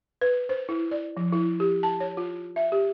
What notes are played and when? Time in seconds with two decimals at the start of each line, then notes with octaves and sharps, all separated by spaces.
0.21 B4
0.49 C5
0.69 E4
0.91 D5
1.17 F3
1.33 E4
1.60 G4
1.83 A5
2.00 C#5
2.17 F4
2.56 E5
2.72 G4